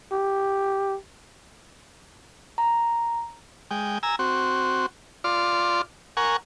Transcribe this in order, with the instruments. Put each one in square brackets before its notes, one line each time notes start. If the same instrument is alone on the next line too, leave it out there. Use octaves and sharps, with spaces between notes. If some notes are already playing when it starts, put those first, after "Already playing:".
[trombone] G4
[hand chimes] A#5
[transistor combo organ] G#3 G5
G#5 A#5 E6
C4 F#4
F4 D5 C6
A#4 F#5 G#5 C#6